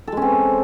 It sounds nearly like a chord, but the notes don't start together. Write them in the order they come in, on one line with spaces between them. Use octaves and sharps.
A4 G#3 C#4 C4